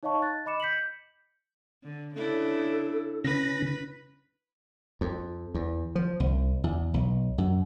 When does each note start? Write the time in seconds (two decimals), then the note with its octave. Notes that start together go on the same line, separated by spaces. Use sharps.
0.03 D#4 C#5 D#5 F5 A5 C#6
0.22 F#6 A6
0.46 D#5 B5 D6 C#7 E7
0.60 G6 B6 C#7 F#7
1.84 D3
2.15 C#3 D4 E4 A4
3.24 C#3 C#4 B4 A#6
5.01 F2
5.54 E2
5.95 F3
6.20 C2
6.64 E2
6.94 B1
7.38 F#2